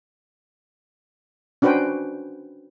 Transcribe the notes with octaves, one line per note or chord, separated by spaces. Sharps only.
C#4 D4 F#4 B4 C5 G5